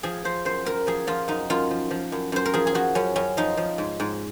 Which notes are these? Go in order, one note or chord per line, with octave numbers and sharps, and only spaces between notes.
F3 G#4
F3 C5
F#2 C5
F#2 A#4
F3 G#4
F3 F4
F#2 D#4
F#2 F4
F3
F3
F#2
F#2 C5
A#4
F3 G#4
G#4
F3 F#4
F#2 C#4
F#2 C#4
F3 D#4
F3
G#2
G#2